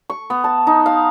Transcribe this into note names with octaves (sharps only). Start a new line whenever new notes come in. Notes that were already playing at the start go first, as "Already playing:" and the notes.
C#6
B3
A5
D#4
F5